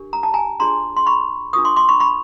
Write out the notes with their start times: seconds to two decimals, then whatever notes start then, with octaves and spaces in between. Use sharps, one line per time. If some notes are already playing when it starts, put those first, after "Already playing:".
Already playing: D4 G4 A#4
0.13 A#5
0.23 A5
0.34 G#5 A#5
0.60 D4 F4 G#4 C#5 A#5 C6
0.97 C6
1.06 B5 C#6
1.53 D4 F4 A#4 C#6 D#6
1.65 C6 D6
1.76 C6 D6
1.89 B5 C#6
2.00 B5 C#6